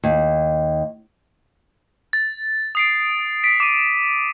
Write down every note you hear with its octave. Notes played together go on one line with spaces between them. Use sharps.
D#2
A6
D#6 C7 D7
B6 D7
D6 D#7